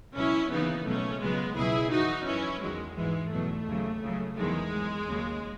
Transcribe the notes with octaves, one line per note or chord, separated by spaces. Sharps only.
C#2 B2 F#3 C#4 E4
D#2 C#3 E3 B3 D#4
C#2 B2 F#3 A3 C#4
C#2 C#3 F#3 G#3 B3
C#2 B2 F#3 E4 G#4
F#2 E3 D#4 F#4
F#2 E3 C#4 E4
E2 D#3 F#3 G#3
G#2 E3 G#3
E2 B2 F#3 A3
D#2 C#3 F#3
C#2 C#3 F#3
E2 D#3 F#3 G#3
G#2 F#3
D#2 C#3 F#3